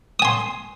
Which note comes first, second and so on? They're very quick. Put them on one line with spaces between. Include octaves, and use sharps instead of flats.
D#6 G#5 C6